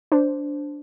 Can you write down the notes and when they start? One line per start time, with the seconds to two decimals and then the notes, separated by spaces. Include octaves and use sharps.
0.12 D4 C5